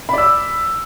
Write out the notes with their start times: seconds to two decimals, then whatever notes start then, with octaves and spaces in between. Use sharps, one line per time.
0.09 B5
0.13 D5
0.18 E6